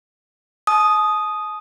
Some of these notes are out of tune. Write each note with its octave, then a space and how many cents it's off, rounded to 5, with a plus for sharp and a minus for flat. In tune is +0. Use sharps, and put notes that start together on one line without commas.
A5 -45 D#6 +0